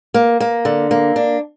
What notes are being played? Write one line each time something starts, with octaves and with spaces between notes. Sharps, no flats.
A#3
A#3
D3
A#3
D4